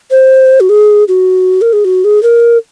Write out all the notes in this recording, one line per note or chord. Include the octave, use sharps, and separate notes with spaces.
C5
F#4
G#4
F#4
A#4
G#4
F#4
G#4
A#4